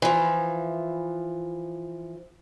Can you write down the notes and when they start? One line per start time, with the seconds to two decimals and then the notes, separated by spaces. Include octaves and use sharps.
0.02 E3 F3